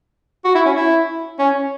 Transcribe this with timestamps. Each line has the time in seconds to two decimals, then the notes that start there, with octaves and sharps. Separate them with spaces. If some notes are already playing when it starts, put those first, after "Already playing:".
0.45 F#4
0.55 E4
0.66 C#4
0.76 E4
1.39 C#4